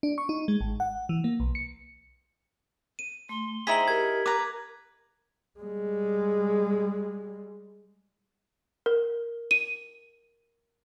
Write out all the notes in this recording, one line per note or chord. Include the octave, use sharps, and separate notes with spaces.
D4
C#6
D#4
G#3
G#1
F#5
E3
A#3
B1
C#7
D#7
A3 C6
D#4 E4 G#4 C5 G5 B6 F#7
G4 A#4 G#6
B4 A#5 D6
G3 G#3
A#4
D#7